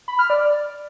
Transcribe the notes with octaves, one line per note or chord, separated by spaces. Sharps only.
B5
F6
D5